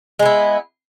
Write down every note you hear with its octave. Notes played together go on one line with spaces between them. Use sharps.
G#3 B3 E4